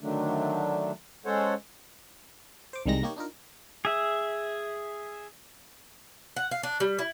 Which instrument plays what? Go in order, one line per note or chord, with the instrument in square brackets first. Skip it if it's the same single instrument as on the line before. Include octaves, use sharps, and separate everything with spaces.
[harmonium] D3 D#3 F#3 A3 D4
G#3 C#4 A4 C5 C#5 F#5
[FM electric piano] C5 D6
C2 D#3 G3 G#3 D#4 A#6
A#3 D#4 G4 C#5
D4 D#4 F4 A#4
[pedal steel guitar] G#4 E5
[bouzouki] F#5
F5
D4
G3
E4